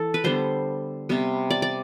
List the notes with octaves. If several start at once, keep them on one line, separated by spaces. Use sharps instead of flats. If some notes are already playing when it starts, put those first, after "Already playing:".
Already playing: E3 A4
B4
D3 G3 B3 C5
C3 G3 B3
D5
D5